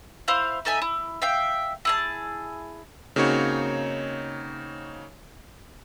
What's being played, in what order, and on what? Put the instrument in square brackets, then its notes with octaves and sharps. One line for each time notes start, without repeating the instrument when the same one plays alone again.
[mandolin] E4 C5 F5
D#4 A4 E5 G#5
E4
E5 F5 G5
E4 G#4 A5
[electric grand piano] C#3 A#3 C4 D#4 F#4 C#5